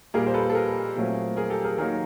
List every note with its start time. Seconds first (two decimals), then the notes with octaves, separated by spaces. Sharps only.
0.14 A#2 G3 A#3 G#4 A#4
0.27 C5
0.34 A4 B4
0.50 A4
0.55 G#4 A#4
0.96 A#2 F#3 A3 C4
1.37 G#4 A#4
1.50 G4 A4
1.64 G#4 A#4
1.78 D#3 F#3 A#3 G#4 A#4